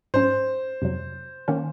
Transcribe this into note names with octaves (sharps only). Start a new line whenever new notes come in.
G#2 F#3 C#4 C5
F2 C3 F#3
D#3 A#3 C#4